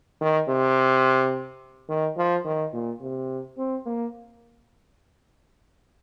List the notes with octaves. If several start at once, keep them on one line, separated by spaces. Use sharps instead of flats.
D#3
C3
D#3
F3
D#3
A#2
C3
C4
A#3